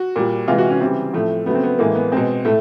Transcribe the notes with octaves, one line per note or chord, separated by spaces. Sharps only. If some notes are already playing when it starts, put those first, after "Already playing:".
Already playing: F#4
A#2 G3
C3 E3 G#3 F4
F#4
C#4
C#3 E3 G3 C4
A2 F3 A3
C#3 F#3 A3 B3
C4
B3
A2 E3 G#3 A#3
B3
B2 G#3 C4
A2 A3